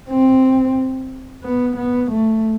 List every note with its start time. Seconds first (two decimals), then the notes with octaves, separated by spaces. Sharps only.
0.09 C4
1.44 B3
1.77 B3
2.11 A3